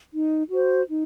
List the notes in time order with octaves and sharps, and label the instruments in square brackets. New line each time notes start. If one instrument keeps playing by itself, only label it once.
[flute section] D#4
F#4 C5
D#4